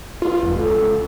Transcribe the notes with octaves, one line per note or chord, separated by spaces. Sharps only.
F4 B4
F1 B4
C#2 A4